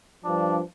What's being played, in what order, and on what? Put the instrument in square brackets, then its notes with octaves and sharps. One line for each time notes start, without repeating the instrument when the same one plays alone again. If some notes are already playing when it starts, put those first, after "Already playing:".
[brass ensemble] G2 F3 D4